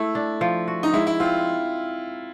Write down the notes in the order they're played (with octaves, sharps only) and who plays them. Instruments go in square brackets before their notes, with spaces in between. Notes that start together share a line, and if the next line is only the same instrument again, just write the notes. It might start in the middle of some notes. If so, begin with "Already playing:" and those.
Already playing: [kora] A3 [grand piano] E4
[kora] D4
F3
F#4
[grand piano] D#4
[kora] G#3 [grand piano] E4
[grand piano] E4
[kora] C4 [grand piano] F4